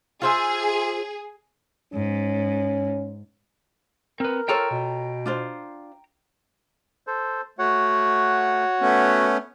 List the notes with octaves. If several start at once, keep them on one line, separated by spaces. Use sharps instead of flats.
F4 G#4 C5 E5
G#2 C#4
C4 A#4 B4
F4 A4 C#5 G5 A#5
B2
D4 F4 C5
A4 C5
A3 F#4 C#5 F#5
A3 B3 C#4